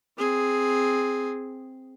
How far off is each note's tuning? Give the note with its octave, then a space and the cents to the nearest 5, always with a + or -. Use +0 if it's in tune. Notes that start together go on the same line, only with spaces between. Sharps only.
C4 +0 G#4 +0